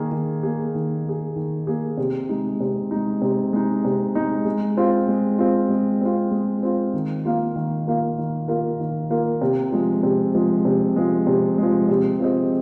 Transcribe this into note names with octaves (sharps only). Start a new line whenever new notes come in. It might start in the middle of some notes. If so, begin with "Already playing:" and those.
Already playing: D#3 A#3 G#4
D#3
A#3 G#4
D#3
A#3 G#4
D#3
A#3 G#4
C3
G#3 D#4
C3
G#3 D#4
C3
G#3 D#4
C3
G#3 D#4
G#3
C4 F4
G#3
C4 F4
G#3
C4 F4
G#3
C4 F4
D#3
A#3 F4 A#4 F5
D#3
A#3 F4 A#4 F5
D#3
A#3 F4 A#4 F5
D#3
A#3 F4 A#4 F5
C3
F3 G#3
C3
F3 G#3
C3
F3 G#3
C3
F3 G#3
C3
F3 C4 G#4 D#5